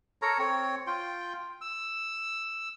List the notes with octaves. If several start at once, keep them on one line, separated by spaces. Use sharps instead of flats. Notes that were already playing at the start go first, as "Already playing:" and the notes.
A4 A#4 C#5 A#5
C4 C#5
F4 G5
E6